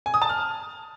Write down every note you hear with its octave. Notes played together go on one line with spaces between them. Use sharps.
G#5
D#6
A5
F6